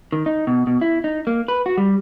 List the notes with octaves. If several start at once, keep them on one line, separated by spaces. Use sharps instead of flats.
D#3
D#4
B2
B2
E4
D#4
A#3
B4
F#4
G3